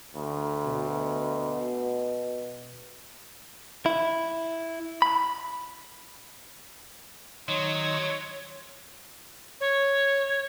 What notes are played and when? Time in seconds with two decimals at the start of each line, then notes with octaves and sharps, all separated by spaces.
0.16 D2
0.66 B2
3.86 E4
5.02 B5
7.48 D#3 F#3 C#5 C6
9.61 C#5